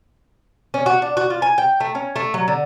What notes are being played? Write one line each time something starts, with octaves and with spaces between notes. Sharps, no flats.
C#4
F#4
D4
F#4
F4
G#5
G5
A3
C#4
A3
F#3
D3